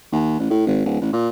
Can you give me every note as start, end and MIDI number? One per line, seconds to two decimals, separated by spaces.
0.12 0.36 39
0.39 0.50 33
0.50 0.65 45
0.67 0.83 32
0.86 0.99 26
1.01 1.10 33
1.13 1.28 46